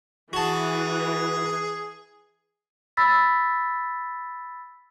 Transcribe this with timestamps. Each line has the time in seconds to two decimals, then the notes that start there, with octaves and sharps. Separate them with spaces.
0.33 E3 F#4 G#4 A5
2.97 B5 E6 A6 B6